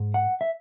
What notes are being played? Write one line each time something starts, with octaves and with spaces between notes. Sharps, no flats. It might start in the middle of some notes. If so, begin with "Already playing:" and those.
Already playing: G#2
F#5
E5